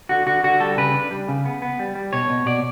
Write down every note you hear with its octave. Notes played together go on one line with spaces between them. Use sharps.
D3 F#4
D3 F#4
D3 F#4
G3 A4
C#3 B4
D4
G3
C#3
B3
B3
G3
G3
B2 C#5
B2
B2 D5